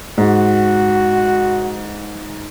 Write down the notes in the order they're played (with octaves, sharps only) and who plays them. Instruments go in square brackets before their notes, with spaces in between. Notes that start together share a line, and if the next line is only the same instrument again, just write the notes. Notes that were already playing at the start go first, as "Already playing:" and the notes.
[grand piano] G#2 [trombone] F#4